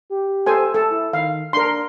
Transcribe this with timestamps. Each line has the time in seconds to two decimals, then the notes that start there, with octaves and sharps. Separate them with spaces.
0.10 G4
0.46 A4 C5 G#5
0.74 A4 A5
0.91 E4
1.13 D#3 F5
1.53 D4 A#4 C6